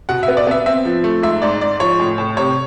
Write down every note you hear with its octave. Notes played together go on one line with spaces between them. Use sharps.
B2 F#5
E5
B3
D5
B3 E5
C4 E5
F3
A3
G#2 E5
G#2 D5
G#2 D5
F3 C#5
A2
A2
C3 C#5